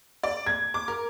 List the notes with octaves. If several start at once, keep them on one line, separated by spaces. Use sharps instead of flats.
D5
G#6
D6
A#4